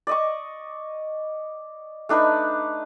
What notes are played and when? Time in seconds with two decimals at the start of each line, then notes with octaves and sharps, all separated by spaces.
0.07 D5 D#5 C#6
2.09 A3 D4 D#4 B4